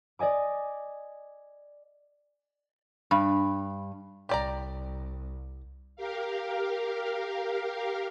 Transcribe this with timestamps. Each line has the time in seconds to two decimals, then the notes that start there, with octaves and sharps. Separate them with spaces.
0.19 D5 D#5 G#5 D6
3.11 G2
4.29 C2 G4 D5 A#5
5.96 G4 A#4 F5